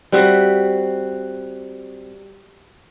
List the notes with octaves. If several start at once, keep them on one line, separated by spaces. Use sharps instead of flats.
G3 C4 F#4 E5